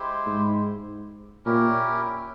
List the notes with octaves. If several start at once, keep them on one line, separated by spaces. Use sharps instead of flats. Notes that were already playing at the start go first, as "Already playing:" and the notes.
Already playing: G#3 E4 G4 C5
G#2
A#2 C#4 E4 G4 A#4